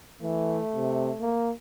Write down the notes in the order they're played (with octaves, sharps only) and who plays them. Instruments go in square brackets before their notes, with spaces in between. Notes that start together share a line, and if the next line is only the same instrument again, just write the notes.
[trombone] E3 [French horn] A3
[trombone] C3
A#3